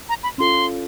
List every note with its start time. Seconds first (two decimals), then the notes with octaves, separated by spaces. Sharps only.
0.09 A#5
0.23 B5
0.38 C#4 F4 A4 C6